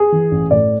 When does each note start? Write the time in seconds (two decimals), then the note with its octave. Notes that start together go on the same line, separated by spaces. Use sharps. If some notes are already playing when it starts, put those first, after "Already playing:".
Already playing: G#4
0.12 E3
0.31 A1
0.51 A2 D5